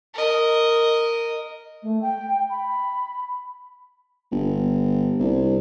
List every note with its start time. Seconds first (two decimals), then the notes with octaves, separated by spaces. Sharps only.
0.14 A#4 D#5
1.83 A3
2.02 G5
2.50 B5
4.32 G1
5.19 C2